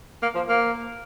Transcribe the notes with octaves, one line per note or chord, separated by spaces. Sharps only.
A#3
F3
A#3